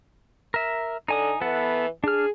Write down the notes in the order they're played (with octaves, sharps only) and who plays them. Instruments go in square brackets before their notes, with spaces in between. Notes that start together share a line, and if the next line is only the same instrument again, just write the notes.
[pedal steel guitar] A#4 E5
[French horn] D3 [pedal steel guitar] D#4 G#5 D#6
[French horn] E3 [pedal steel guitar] B3 A4 F#5
[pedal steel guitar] D4 F6 [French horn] G#4